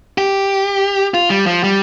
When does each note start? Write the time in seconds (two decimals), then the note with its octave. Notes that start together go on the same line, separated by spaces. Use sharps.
0.18 G4
1.14 F4
1.30 G3
1.46 F3
1.64 G3